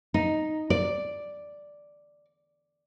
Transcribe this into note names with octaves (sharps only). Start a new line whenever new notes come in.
D#4
D5